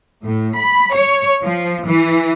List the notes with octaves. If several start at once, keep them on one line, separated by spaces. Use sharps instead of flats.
A2
B5
C#5
F3
E3